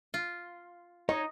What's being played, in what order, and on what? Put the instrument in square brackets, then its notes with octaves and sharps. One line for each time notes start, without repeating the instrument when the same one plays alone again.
[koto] F4
[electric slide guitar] D#4 [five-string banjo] C#5 [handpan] D#5